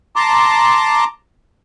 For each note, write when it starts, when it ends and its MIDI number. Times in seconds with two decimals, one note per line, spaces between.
0.16 1.04 81
0.16 1.04 82
0.16 1.04 84
0.16 1.04 86